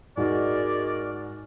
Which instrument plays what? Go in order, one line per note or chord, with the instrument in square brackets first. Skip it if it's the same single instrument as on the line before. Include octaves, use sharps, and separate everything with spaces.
[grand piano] G#2 F#4 D#5 [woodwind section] G#3 A#4 D5